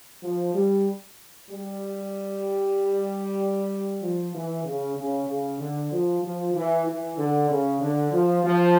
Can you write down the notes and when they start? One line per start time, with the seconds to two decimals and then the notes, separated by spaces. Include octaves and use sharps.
0.23 F3
0.54 G3
1.49 G3
4.01 F3
4.34 E3
4.64 C#3
4.96 C#3
5.27 C#3
5.60 D3
5.91 F3
6.23 F3
6.55 E3
6.86 E3
7.17 D3
7.49 C#3
7.81 D3
8.12 F3
8.44 F3